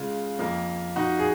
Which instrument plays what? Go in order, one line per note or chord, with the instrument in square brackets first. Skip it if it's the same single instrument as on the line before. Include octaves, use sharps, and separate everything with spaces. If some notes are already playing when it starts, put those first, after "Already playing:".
Already playing: [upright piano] C#3 G#3 F4
F2 F3 A#3
D#4 F#4
G#4